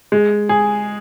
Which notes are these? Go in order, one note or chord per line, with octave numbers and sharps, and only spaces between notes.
G#3
G#4